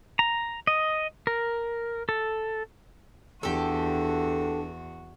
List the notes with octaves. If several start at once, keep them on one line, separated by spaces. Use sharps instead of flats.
A#5
D#5
A#4
A4
E2 D4 F#4 G4 A4